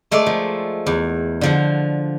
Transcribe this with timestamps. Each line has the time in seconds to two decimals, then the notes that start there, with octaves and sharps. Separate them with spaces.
0.11 G#3 A3 A4 A#4 D5
0.26 F3
0.86 E2
1.41 D3 F3 F#5